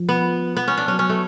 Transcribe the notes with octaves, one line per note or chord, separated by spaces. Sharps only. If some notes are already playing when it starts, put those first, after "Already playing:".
Already playing: F3
B3
B3
C#4
D4
F#3 C#4
C#4
A3